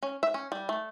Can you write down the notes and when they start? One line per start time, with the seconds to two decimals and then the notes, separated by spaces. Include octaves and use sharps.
0.03 C#4
0.23 E5
0.34 C#4
0.52 G3
0.69 A3